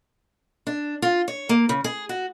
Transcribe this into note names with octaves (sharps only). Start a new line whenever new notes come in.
D4
F4
C#5
A#3
C#3
G#4
F#4